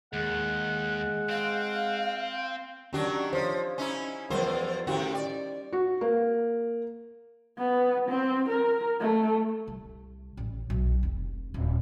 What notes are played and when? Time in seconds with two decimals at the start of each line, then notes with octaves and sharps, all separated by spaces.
0.13 D#2 G#3 F#5
1.29 C4 F5
2.93 D#3 F#3 C#4 D4 G4
3.33 F3 C5 C#5
3.78 C#4 D#4 E4
4.30 E2 F3 G3 A#4 C5
4.87 A2 D#3 C#4 E4 F#4 G4
5.15 D5
5.73 F#4
6.01 A#3
7.58 B3
8.08 C4
8.49 A#4
9.00 A3
9.67 C2
10.37 A1
10.70 B1
11.03 F1
11.54 D#1